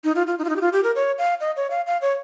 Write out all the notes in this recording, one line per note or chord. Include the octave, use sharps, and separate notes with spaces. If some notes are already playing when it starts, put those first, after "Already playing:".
D#4
F4
F4
D#4
F4
D#4
G4
F4
G4
A#4
C#5
F5
D#5
C#5
F5
F5
C#5